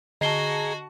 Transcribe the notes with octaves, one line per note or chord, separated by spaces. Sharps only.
D3 F#4 G#4 D#5 A5 A#5 C7 G7